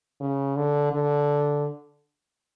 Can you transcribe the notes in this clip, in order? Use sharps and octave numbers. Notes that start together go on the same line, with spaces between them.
C#3
D3
D3